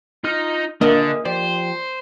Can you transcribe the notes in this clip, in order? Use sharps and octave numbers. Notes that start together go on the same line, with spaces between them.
D#4 F4 F6
D3 A#3 D4 G#4 D#5 E5 D#6 F6
F3 G4 C5 D5